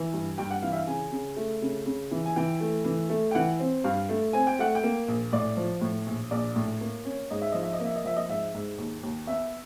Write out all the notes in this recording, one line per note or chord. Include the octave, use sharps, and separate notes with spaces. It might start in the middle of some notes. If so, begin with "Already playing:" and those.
Already playing: E3
G2
G2 G5
F#5
E3 F5
E5
F5
C#3 G#5
C#3
A3
C#3
C#3
E3
G#5
E3 G5
A3
E3
A3
G5
E3 F#5
C4
G2 F5
A3
C4 G#5
G5
A3 F#5
G5
A#3
A#1
A2 D5
F3
A2
A#1
A#1 D5
A2
A#3
C#4
G#2 D#5
E5
F3 D#5
E5
D#5
A#3 E5
D#5
F3 E5
D#5
G#2 E5
G#2
D#2
D#2
B3 E5